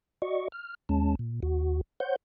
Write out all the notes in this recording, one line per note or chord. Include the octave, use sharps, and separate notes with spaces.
F#4 D5 D#5 C#6
F6
D#2 G#3 C#4 A5
A#2
D#2 F#4
C5 C#5 F#5 G6